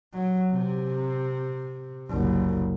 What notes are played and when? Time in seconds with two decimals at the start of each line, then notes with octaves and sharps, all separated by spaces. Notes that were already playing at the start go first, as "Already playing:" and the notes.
0.13 F#3
0.51 C3
2.09 F#1 C2